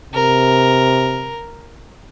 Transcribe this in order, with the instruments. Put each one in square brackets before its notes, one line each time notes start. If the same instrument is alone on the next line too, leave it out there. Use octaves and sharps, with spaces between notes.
[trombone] C3 [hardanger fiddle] A#4